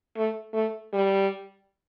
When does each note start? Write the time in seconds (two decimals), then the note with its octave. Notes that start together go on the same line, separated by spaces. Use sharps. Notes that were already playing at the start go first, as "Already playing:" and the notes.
0.17 A3
0.54 A3
0.93 G3